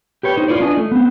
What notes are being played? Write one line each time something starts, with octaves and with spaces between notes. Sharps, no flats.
G4 B4 C#5 G5
D#4 C5 D#5
E4 F4 B4 C#5 D5
C#4 D4 D#5 G#5
A3
B3 C4